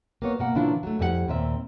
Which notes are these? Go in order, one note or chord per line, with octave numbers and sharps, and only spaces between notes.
A#3 B3 C#5
B2 A#3 F#5
A#2 C#3 E3 D4 E4 F4
F#3 A3
F2 G3 E4 G#4 F#5
D#2 A#2 C4 E5